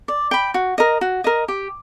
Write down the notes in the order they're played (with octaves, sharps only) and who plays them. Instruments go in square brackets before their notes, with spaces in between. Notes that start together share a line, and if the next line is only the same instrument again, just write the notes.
[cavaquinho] D5
G5 B5
F#4
A#4 D#5
F#4
A#4 D#5
G4